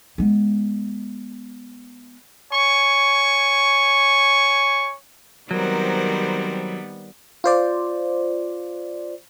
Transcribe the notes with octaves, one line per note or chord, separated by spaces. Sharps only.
G#3 B3
C#5 G#5 C#6
D#3 F#3 G3 B3 C4 A#4 C5
F4 C5 D5